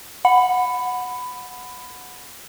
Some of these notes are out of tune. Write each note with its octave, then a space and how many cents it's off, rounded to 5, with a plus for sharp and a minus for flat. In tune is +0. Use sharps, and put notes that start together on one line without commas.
F#5 -15 B5 +15